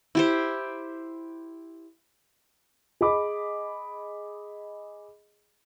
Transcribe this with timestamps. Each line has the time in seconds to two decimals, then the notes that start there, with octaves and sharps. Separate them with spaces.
0.15 E4 G4 C5
3.01 G#4 D#5 B5 D6